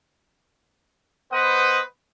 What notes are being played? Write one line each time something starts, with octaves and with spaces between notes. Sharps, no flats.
B3 B4 C5 D#5 F#5 D#6